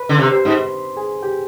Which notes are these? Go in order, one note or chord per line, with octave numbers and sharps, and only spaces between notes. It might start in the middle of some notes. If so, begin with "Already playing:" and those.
Already playing: B4 B5
D3
C3
C5 C6
G#2
G#4 G#5
G4 G5